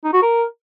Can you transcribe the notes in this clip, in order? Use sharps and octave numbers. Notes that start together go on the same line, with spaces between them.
D#4
F#4
A#4